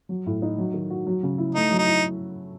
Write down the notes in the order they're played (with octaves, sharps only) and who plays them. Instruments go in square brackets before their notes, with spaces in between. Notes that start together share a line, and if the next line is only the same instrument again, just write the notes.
[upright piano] F#3
A2
D#4
F#3
D#3
F#4
F#3
C#3
E4
[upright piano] A3 [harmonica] D#4
[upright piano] F#3
[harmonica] D#4
[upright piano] E4